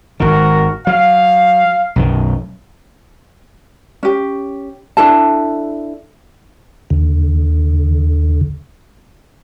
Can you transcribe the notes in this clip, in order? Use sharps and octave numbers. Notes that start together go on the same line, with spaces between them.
G#1 D#3 F#4 A#4
F#3 F5
B1 F#2 D#3
C#4 G4
D4 E4 A4 A5
D#2 D3